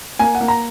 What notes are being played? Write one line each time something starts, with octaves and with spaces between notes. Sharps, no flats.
A#3 G#5
F#5
A#3
A#5